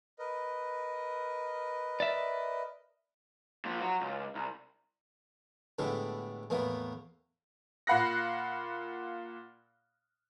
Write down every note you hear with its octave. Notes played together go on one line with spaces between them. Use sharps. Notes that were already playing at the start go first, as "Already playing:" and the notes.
A#4 B4 D#5
D5 E5
A#2 F3
F#3 F#4
C#2
C2
A2 D3 G3 G#3 B3
E2 A2 A#3 B3
A#2 F5 F#5 B5 F#6 A#6